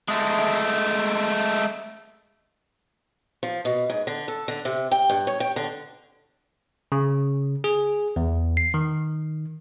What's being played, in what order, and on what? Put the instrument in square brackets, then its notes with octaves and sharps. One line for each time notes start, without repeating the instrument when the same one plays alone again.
[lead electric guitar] G#3 A3
[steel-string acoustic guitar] F3
B2
G#2
D3
A4
D3
C3
G5
G2
C#5
G5
D3
[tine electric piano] C#3
G#4
E2
C7
D#3